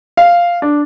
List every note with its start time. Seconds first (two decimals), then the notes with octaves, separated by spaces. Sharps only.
0.17 F5
0.62 D4